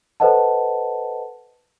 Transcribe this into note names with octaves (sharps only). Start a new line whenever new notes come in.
A4 B4 C5 D#5 F#5 A5